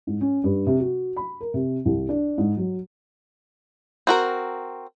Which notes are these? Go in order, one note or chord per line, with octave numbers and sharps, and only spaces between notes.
G#2
C#4
G2
C3
F#4
B5
A#4
C3
C2
D4
G#2
F#3
C4 F#4 A#4